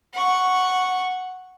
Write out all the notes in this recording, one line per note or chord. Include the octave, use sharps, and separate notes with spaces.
F#5 C#6